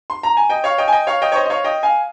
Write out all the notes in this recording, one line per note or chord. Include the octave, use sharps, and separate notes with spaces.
C6
A#5
G#5
D#5 G5
C#5 F5
D#5 G5
G#5
D#5 G5
C#5 F5
D#5 G5
C#5
C5 D#5
D#5
C#5 F5
D#5 G5
F5 G#5